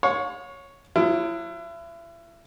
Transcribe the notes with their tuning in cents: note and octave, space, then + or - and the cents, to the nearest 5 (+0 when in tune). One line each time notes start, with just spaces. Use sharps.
C#5 +0 F5 +45
F#3 -25 E4 +35